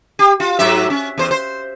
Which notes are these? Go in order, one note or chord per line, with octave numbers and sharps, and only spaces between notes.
G4
F4
G#2 F#3 E5
C#4
E2 C5
C5